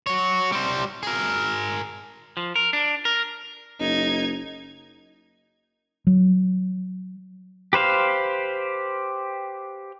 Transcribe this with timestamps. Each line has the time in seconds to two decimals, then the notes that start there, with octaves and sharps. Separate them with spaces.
0.07 F#4 C#5
0.52 G3 C5
1.03 G#4 A#4
2.37 F3
2.56 A#4
2.73 D4
3.05 A#4
3.80 F#1 D#4 G#6
6.07 F#3
7.73 G4 B4 C5 F5